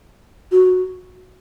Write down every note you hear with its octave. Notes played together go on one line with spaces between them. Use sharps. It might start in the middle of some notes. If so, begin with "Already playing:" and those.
F#4